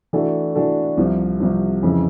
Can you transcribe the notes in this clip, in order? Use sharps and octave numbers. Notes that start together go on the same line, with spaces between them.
E3 A3 D4 F#4 A4
E3 A3 D4 F#4 A4
C2 C3 F3
C2 C3 F3
F2 C#3 E3 G#3